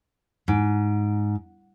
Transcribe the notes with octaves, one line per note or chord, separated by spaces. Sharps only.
G#2